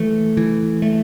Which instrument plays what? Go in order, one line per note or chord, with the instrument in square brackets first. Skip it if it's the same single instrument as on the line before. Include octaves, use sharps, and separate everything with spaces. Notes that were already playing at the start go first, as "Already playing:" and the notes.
Already playing: [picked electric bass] E3 A3
E3
A3